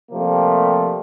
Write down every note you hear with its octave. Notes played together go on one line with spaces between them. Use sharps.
C3 F3 G3 A3 A#3